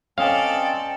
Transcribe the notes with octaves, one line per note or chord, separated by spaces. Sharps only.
C4 C#4 A4 D5 D#5 F5 G#5